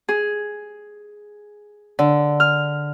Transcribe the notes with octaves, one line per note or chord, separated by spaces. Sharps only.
G#4
D3
F6